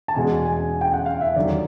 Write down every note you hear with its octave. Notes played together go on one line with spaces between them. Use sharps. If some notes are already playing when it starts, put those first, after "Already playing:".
A5
E2 B2 G#3 G#5
G#5
G5
F#5
F5
E5
D#2 D3 F#3 D5